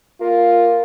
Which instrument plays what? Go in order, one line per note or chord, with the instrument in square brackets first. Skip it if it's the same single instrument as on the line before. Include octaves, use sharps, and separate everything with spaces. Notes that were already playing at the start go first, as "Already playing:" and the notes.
[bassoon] A#3 [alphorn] F4